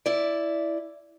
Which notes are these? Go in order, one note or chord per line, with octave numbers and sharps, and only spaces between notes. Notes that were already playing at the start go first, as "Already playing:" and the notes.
E4 D5